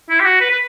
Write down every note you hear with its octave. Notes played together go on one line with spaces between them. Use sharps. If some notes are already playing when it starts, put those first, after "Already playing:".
E4
G4
F#4
B4
B4